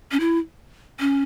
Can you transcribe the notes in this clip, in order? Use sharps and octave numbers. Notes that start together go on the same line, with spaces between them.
C#4
E4
C#4